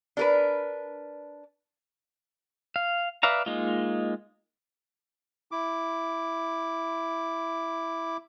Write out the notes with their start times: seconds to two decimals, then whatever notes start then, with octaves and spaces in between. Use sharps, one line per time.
0.17 D4 A#4 B4
2.76 F5
3.23 B4 D5 E5 F5 A#5
3.46 G#3 A#3 D#4 F4
5.52 E4 D6